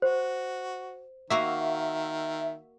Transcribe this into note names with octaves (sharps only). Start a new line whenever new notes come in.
F#4 C5
D#3 A#3 F#4 E5 F5